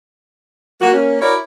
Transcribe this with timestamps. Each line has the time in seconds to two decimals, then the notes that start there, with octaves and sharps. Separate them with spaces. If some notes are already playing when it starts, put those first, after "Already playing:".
0.81 A#3 F#4
0.93 A#3 C#4
1.21 E4 F#4 A#4 C#5 D5